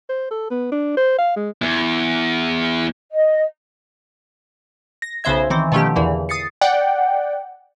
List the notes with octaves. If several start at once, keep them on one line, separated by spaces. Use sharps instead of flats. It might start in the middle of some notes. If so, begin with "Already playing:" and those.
C5
A4
B3
D4
C5
F5
G#3
E2
D#5
A#6
B1 C#3 B3 C5 E5 G#6
D#3 E3 C4
B2 D#3 F3 A3 C#4 G4
E2 A#2 D3 E3
D#6 A6 C7 C#7
D5 F#5 G5